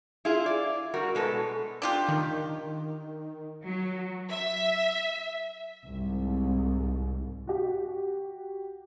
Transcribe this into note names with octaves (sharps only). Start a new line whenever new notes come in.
E4 F4 G#4
D5
G3 F#4 A#4
B2 G#3 A4 B4
D4 F4 G4
D#3
F#3
E5
C2 G#2
F#4 G4